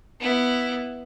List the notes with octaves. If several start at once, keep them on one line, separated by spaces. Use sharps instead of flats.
B3 E4